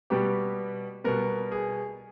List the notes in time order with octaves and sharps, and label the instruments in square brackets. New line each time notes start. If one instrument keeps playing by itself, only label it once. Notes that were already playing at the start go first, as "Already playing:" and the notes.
[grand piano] B2 G3 B3 G4
B2 G3 B3 A#4
G#4